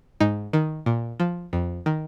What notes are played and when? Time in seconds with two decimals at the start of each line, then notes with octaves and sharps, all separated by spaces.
0.20 G#2 D#4
0.53 D#3
0.86 A#2
1.20 F3
1.53 F2
1.86 D#3